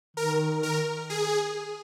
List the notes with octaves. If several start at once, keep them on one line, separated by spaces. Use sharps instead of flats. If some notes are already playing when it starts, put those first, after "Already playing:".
D#3 A#4
A#4
G#4